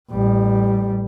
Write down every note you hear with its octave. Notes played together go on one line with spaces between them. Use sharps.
A1 G3